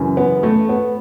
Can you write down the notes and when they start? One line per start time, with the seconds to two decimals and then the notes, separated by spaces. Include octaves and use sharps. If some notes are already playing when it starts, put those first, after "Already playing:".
Already playing: F#2 C#3 E3
0.17 B3
0.43 A3
0.69 B3